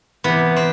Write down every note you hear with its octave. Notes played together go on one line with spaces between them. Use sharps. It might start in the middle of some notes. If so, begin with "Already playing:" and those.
C3 E3 B3
C4